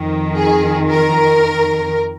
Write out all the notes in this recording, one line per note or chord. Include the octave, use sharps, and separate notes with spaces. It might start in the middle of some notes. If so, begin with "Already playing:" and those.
Already playing: F2 D#3
G#4
A#4